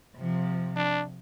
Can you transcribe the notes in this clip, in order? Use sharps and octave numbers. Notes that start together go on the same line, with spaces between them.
C3 F3
D4